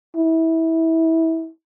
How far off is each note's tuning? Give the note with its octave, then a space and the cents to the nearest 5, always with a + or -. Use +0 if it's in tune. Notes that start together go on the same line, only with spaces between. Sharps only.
E4 -25